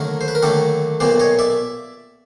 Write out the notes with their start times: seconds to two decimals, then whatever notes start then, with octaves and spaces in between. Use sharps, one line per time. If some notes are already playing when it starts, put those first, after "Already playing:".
Already playing: D#2 D3 F#3 A3 A#4
0.21 C5
0.28 B4
0.35 A#4
0.42 D#2 D3 F#3 A3 G4 A4
1.00 B1 A#2 G3 B3 C5 D5
1.20 C#5 D#5
1.39 D5 E5